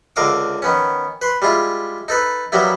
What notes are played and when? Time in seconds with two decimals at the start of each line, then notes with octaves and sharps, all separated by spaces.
0.16 C#2 D3 A#4 F5 D6 D#6
0.62 D#3 B3 C#4
1.22 B4 C6
1.42 G3 G#3 E4 F4
2.08 D#4 A4 B4
2.52 F#3 G3 A#3 B3 E4